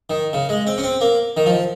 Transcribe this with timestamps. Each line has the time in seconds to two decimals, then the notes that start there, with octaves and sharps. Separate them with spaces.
0.10 D#3
0.33 C#3
0.49 G#3
0.67 C4
0.78 C#4
0.84 C4
1.01 A#3
1.37 D#3
1.46 F3